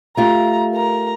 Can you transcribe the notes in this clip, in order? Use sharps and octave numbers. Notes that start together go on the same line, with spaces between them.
A3 F4 G4 A#5
A#4 A#5